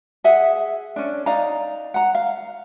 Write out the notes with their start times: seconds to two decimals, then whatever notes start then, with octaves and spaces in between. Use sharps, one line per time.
0.24 G#4 E5 F#5
0.96 C#4 D4
1.26 D#4 D5 F5 A#5
1.94 F#5 A#5
2.15 F5